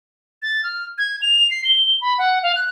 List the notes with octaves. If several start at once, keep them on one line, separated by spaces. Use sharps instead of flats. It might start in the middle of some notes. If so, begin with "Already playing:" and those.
A6
F6
G#6
F7
C7
G7
B5
F#5
F5
F#6